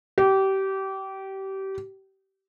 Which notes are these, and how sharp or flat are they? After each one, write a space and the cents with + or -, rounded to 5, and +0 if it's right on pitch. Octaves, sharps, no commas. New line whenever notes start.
G4 -25